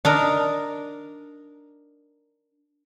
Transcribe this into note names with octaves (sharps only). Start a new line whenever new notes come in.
D4 D#4 A#4